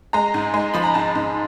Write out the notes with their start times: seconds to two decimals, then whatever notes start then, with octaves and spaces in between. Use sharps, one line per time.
0.13 G#3 A#5
0.34 G#2
0.54 G#3
0.74 F3 B5
0.84 A#5
0.94 G#2 A5
1.15 G#2